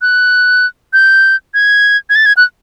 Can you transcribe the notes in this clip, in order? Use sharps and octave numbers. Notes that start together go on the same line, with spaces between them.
F#6
G6
G#6
G#6
A6
G#6
F#6